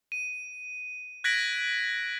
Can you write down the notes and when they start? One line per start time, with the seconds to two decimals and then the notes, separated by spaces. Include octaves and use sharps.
0.12 D#7
1.24 F#6 G#6 A#6 B6 D7 F#7